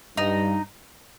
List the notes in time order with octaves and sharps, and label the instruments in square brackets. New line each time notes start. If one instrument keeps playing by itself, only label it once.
[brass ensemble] G2 [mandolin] D#4